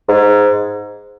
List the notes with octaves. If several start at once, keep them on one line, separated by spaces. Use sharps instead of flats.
G#2